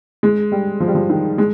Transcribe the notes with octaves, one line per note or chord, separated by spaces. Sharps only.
G#3
G3
F3
G3
F3
D#3
G#3